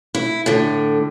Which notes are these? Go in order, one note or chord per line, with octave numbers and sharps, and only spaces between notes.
E4
A2 D3